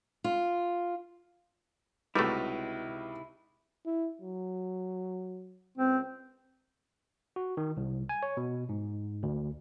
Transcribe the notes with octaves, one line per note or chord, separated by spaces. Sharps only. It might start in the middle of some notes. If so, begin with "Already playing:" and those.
F4
C#2 C3 G3 A3 D#4 E4 F#4 B4
E4
F#3
C#2 C4
F#4
D#3
C2
G#5
C#5
B2
G#2
D2